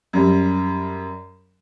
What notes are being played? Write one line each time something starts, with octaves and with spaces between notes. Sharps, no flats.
F#2 G3